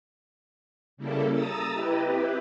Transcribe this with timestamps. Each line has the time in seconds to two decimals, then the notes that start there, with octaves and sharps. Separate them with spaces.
0.97 C#3 G3 A#3 E4 A4
1.31 A#5 D#6 E6 A6
1.70 E4 G4 B4 D#5
2.04 C4 E4 G4 B4